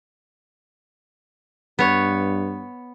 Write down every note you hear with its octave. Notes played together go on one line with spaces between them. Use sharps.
G2 B3 C#5